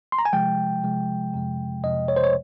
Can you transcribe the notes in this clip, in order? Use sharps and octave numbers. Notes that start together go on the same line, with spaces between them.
C6
A#5
G#5
C3 F3 G#3 G5
C3 F3 G#3
F2 C3 F3 G#3
F2 C3 F3 G#3 D#5
C#5
C5
C#5